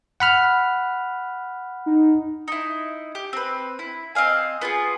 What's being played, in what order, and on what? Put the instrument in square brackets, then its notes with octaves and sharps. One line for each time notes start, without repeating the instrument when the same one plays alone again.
[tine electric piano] F#5 B5 F6
[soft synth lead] D#4
[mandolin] D#4 E4
G4
C4 B4
E4
C4 D#5 F5 G#5
B3 F4 G4 G#4